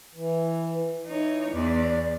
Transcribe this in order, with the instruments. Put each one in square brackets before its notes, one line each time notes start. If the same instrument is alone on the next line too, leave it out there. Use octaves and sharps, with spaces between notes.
[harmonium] E3
[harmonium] E3 [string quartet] D#4 C#5
[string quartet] E2 [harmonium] D5